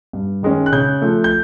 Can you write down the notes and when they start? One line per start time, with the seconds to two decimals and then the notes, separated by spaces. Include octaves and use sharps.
0.13 G2
0.43 D#3 G#3 C#4
0.66 F#6
0.72 C#3 G6
1.02 F3 A3
1.24 G6